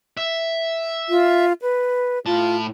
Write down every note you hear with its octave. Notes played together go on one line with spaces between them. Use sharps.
E5
F4
B4
A2 F4 A5